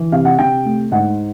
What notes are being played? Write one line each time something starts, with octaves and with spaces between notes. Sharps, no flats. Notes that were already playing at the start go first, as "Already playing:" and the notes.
Already playing: E3
C3 F5
F#5
C3 G5
A3
G#2 F#5